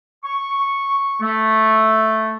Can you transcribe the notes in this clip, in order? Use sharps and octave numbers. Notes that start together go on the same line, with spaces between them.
C#6
A3